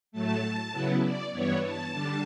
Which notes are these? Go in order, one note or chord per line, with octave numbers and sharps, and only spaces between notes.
A2 F#3 A3 A5
C#3 F#3 B3 E4
D5
G2 E3 B3 E4 C#5
A5
D3 G3 D4